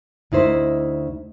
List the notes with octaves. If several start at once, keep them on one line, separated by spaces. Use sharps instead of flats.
D2 D#4 E4 C5